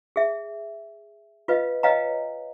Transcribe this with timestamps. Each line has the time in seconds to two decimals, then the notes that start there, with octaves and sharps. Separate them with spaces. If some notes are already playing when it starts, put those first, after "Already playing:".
0.16 G#4 E5
1.48 F4 B4 D#5 F5
1.83 B4 C#5 D#5 F5 G5 A#5